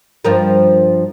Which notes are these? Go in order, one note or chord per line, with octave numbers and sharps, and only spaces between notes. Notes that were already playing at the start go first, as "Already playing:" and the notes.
G2 F3 A#4